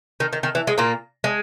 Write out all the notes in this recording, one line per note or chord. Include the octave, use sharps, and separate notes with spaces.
D#3
D#3
D#3
E3
G#3
A#2 A#3
G#3